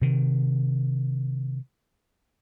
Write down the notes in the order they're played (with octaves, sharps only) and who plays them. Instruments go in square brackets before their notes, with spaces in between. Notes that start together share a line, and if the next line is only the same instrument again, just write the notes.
[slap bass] C3 D#3